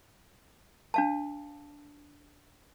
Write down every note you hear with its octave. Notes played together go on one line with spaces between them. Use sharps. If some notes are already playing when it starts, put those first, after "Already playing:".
D4 F5 A5